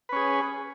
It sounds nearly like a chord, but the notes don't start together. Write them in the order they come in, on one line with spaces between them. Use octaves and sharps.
B4 C#4 G#4